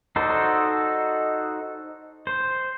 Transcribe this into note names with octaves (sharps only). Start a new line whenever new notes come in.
D#4 F#4 A4 C5 D5
C5